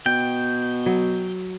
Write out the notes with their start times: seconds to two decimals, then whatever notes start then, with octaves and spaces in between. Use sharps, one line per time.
0.06 B2 G5
0.86 F#3